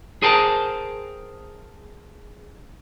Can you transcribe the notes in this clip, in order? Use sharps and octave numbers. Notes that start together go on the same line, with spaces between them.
G#4 A#4 C5 G5 A5